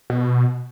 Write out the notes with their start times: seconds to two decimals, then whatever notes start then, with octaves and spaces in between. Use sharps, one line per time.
0.10 B2